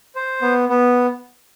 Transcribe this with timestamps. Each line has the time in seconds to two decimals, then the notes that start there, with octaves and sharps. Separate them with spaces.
0.15 C5
0.42 B3
0.69 B3